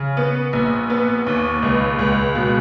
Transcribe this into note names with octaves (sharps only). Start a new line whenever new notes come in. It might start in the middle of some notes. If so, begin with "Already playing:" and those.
Already playing: C#3
B3
A#1
B3
D#2
C#2
C#2
B2